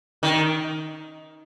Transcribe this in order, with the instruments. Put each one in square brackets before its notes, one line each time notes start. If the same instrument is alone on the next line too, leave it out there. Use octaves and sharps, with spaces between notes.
[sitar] D#3